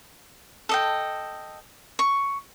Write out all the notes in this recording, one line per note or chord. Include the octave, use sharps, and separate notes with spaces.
A4 D#5 G5
C#6